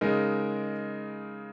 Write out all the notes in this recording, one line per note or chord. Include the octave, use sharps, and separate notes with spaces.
C#3 G#3 D#4 A#4